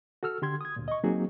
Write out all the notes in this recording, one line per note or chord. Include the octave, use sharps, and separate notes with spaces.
F#4 A4 E6 F6
D3 G4 C6 G#6
D#6 G#6
D2 A#2
D#5 C#6
F#3 A#3 C4 D#4 F#4 G#4